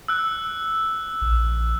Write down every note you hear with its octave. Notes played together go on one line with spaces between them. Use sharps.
E6 F#6
A#1